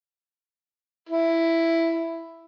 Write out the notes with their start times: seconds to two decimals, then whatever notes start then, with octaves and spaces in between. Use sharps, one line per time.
1.09 E4